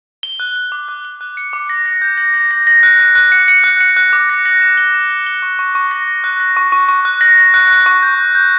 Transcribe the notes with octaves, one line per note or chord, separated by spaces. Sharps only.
G7
F#6
G7
D6
F#6
G7
F#6
C#7
D6
A#6
A#6
G6
A#6
A#6
A#6
A#6
F#6
F#6
F#6
C#7
C#7
F#6
C#7
F#6
D6
A#6
A#6
E7
G7
E7
G7
G7
C#6
C#6
C#6
A#6
A#6
F#6
A#6
C#6
C#6
C#6
F#6
A#6
A#6
F#6
F#6
C#6
G6
G6
G6